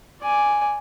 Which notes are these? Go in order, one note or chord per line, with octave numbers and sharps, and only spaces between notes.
D5 G#5